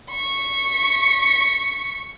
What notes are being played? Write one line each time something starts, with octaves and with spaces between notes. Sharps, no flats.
C#6 B6